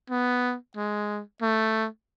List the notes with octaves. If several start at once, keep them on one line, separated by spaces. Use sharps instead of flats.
B3
G#3
A3